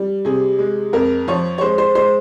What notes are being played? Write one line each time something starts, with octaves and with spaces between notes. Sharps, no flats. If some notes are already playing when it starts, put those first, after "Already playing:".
Already playing: G3
C3 G#4
G#3
F2 A#4
F3 C#5
C#5
G#3 C5
C5
G#3 C5